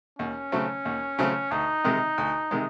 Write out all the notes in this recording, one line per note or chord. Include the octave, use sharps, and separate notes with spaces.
D#2 C#4
C#3 F#3 A3 C4
D#2
C#3 F#3 A3 C4
D2 D#4
C3 D#3 G#3
D2
C3 D#3 G#3